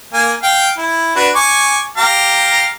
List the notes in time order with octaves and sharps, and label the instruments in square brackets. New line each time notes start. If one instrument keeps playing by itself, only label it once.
[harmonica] A#3 G#5
F5 G5
E4
D4 F#4 B4
G#5 C#6 D6
G4 F5 A#5